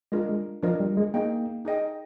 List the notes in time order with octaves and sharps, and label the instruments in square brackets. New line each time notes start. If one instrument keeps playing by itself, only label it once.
[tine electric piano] G#3 [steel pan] D4 F4 A#4 D#5
[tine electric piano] G#3
[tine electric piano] F3 [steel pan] D4 F4 A#4 D#5
[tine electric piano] G3
G#3
[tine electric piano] A#3 [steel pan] D#4 G#4 D#5 G5
[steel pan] D#4 G#4 D#5 G5